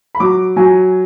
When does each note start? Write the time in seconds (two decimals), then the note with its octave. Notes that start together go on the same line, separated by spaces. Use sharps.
0.15 B5
0.20 F#3 D6
0.56 F#3 G#5